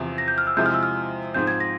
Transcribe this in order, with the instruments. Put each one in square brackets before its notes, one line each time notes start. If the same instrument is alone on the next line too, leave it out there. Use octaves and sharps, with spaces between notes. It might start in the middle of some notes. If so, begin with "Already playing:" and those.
Already playing: [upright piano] E2 C3 F3
[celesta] A#6
G6
F6
E6
[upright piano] C3 F3 G#3 E4 [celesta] G6
[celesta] F6
E6
F6
[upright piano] G#2 F3 C4 [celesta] G6
[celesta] G#6
A#6